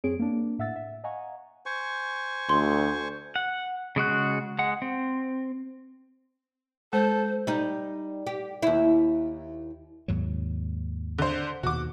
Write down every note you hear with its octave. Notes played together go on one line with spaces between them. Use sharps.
F#2 C4 G#4 C#5 D7
A#3 D4
A2 E5 F#5 E6 A6
E5
D#5 F5 F#5 G#5 A#5 C#6
C5 G#5 C#6
D2 C6
F#5
C#3 G#3 F#4 F#6
G#3 F#5
C4
G#3 A4 C5
G3 D#4
G4
D#2 E4
D#2 G#2 F#3
D3 C5
D#2 B2 F#4 D6